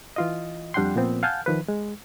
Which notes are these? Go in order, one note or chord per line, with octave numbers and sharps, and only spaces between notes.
E3 F4 D#5
F2 G3 D4 F#5 G5 C6
A#2 F3 B3 C4
F5 F#5 G#5 A5 F6 G6
D#3 F3 B4
G#3